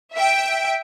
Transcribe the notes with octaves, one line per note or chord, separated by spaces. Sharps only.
E5 G5